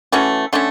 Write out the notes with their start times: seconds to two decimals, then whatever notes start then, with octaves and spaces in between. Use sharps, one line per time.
0.12 E3 A3 C#4 F#4
0.53 D3 A3 C#4